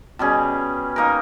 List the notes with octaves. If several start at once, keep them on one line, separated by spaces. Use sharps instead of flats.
B2 G3 C#4 G#4
A#3 D#4 A#4